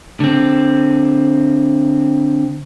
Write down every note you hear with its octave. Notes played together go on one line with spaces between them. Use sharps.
D3 C4